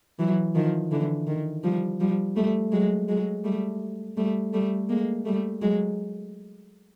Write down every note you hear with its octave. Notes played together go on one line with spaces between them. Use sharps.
E3 F#3
D#3 F3
D3 E3
D#3
F3 G3
F3 G3
G3 A3
F#3 G#3
F#3 G#3
G3 A3
G3 A3
G3 A3
G#3 A#3
G3 A3
F#3 G#3